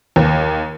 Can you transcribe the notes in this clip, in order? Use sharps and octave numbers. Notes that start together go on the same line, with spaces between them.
D#2